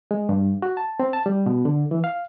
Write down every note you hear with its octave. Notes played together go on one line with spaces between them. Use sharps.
G#3
G2
F#4
A5
C4
A5
G3
B2
D3
E3
F5